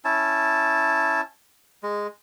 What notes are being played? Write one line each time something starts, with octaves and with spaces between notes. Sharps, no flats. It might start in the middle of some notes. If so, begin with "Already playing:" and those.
C#4 E4 A5
G#3